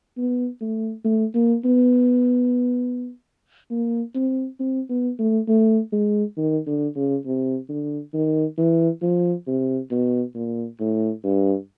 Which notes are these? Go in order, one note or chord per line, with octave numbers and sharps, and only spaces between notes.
B3
A3
A3
A#3
B3
A#3
C4
C4
B3
A3
A3
G#3
D#3
D3
C#3
C3
D3
D#3
E3
F3
C3
B2
A#2
A2
G2